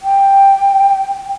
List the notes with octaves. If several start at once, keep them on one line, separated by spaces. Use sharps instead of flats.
G5